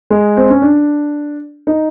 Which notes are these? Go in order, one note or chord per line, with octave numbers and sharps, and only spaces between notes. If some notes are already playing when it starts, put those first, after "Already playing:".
G#3
C4
C#4
D4
D#4